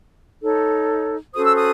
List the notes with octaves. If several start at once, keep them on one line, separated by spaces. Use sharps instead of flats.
D#4 A4 C#5
C#4 F#4 A4 C5 D#6
E6
D#6